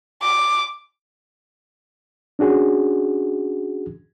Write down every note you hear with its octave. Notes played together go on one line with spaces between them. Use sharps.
D6
C#4 D4 F#4 G#4